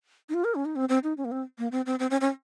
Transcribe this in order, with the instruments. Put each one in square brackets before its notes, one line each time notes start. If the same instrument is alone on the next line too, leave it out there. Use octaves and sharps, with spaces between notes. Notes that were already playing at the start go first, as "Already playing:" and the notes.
[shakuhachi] D#4
F4
A#4
C#4
D#4
C4
C4
D#4
C#4
A#3
C4
A#3
C4
C4
C4
C#4
C#4